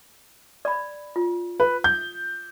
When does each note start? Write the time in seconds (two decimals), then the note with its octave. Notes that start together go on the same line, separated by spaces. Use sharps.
0.65 D5 B5
1.16 F4
1.60 B4
1.84 G6